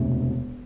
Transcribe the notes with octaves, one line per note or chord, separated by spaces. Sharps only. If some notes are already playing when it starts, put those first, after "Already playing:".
Already playing: E1 D2 C3